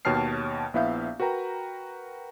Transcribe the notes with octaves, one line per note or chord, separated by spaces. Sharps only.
D#2 B2 C#5 A5 F6 C7
A#1 B3 E4 E5 F5 G6
F#4 A#4 B4 G5 A#5